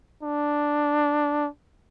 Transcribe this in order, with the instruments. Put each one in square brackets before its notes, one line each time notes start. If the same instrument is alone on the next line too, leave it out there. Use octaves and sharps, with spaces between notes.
[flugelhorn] D4